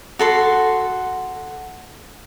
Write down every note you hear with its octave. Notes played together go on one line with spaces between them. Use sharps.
F#4 A4 C6